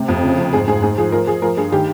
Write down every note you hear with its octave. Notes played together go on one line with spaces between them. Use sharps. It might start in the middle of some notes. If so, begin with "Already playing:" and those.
Already playing: C3
F2
C#3
F3
G#2 G#4
G#2 G#4
G#2 G#4
F3 G#4
F3 A#4
F3 G#4
F3 A#4
G2 G#4
D#3 G4